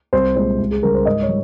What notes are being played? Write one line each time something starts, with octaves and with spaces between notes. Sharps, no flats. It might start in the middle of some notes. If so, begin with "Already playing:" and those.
C2 C5
A#2 G#3 C5
C#2
G#4
C#3 G3 A#4
C5
G#2 D#5
C#5
G3